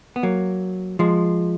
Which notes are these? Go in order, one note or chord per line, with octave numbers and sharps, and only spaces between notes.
B3
F#3 A#3
F3 G#3